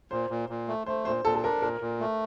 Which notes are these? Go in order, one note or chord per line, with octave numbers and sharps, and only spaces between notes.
A#2 C5
A#2
A#2
A3
A3 C5
A#2 C5
A#2 A4
A4
D4 A#4
A#2 A#4
A#2
A3